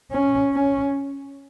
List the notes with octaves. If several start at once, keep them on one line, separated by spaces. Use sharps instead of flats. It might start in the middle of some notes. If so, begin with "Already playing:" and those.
C#4
C#4